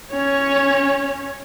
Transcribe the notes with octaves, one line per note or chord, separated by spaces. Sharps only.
C#4 C#5